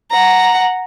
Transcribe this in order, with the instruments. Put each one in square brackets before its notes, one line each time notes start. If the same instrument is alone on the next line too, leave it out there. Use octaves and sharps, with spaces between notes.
[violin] F#5 A#5